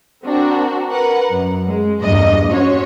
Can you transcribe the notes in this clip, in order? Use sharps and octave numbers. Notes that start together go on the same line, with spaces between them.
C4 D4 F#4 A#4
A#4 B4 F#5
F#2
G#3
E2 G2 A#2 D#5
C#4 F#4 C5 C#5